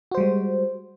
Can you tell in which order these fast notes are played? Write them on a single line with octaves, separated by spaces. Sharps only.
F#4 C5 G3 G#3